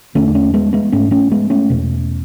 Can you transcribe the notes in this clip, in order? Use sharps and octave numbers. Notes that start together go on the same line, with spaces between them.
E2 D3 A3 C#4
D4
A3 C#4
G#3 B3
G#3 B3
G#2 A3 C#4
A3 C#4
G#3 B3
A3 C#4
E2 B2